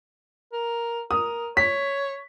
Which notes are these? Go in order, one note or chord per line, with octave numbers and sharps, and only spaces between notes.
A#4
A#4 D#6
C#5 B6